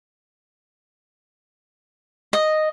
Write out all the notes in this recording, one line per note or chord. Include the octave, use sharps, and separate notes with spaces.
D#5